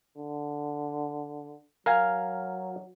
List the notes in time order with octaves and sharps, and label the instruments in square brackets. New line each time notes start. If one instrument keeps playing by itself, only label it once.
[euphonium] D3
[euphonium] F#3 [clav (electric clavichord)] A#4 F5 G#5